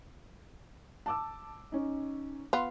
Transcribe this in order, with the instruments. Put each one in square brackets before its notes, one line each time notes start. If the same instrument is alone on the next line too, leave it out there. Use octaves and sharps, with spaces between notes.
[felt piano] A5 D6 E6
C#4 D#4
[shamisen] B3 F4